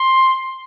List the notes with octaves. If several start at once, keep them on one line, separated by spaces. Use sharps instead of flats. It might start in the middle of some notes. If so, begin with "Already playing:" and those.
Already playing: C6